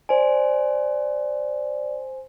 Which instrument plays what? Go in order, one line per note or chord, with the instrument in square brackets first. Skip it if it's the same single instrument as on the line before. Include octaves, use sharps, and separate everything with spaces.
[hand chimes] C5 G#5 [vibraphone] D5